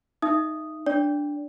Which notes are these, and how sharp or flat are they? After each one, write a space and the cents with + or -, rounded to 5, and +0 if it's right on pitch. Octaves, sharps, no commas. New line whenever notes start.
D#4 +0 E5 +25 D#6 +0
D4 +0 D5 -30